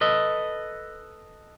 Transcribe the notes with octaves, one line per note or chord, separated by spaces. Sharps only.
A4 B4 D#5